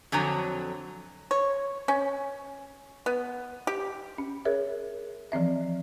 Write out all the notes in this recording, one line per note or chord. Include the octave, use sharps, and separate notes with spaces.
F2 D3 F#3 G#5 A#5
C#5
C#4
B3
G4
C#4
G#4 A#4 C#5 E5
E3 F3 C4 E5